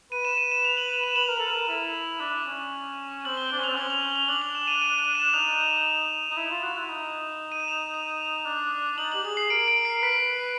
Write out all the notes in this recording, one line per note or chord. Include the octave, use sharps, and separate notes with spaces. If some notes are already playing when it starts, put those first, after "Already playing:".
B4 D#7
E7
D#7
E7
F7
F#7
F7
E7
B4 F#7
A#4
A4
A#4
E4
D4
C#4
C4 F#7
G7
D4 F#7
C#4
C4 F7
C#4 F#7
F7
G7
F7
D4 F#7
F7
E7
D#7
D#7
D#7
E7
D#4 F7
D#4
E4
F4
F#4
E4
D#4
D#7
E7
F7
F7
D4
D#4 F#7
G4 F#7
G#4 F#7
C7
A#4 D7
D7
C7
B4 B6